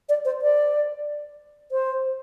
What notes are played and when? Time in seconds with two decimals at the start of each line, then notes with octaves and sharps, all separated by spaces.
0.09 D5
0.25 C5
0.42 D5
1.72 C5